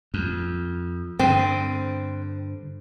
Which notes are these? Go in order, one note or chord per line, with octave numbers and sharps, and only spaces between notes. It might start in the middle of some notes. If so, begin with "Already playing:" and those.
F2
G2 D3 C4